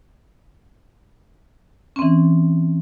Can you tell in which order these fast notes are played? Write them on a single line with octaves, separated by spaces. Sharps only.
C#4 C4 E3